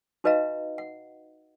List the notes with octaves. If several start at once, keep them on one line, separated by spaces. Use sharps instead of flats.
D#4 F#4 B4 D#5 F5 A#5
F#5